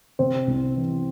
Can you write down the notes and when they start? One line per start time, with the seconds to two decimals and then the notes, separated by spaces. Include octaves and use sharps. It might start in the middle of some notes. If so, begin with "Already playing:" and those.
0.19 C3 C4 C5
0.48 C2
0.75 E3